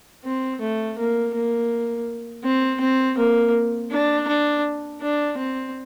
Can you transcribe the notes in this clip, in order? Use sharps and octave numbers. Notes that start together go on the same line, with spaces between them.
C4
A3
A#3
A#3
C4
C4
A#3
D4
D4
D4
C4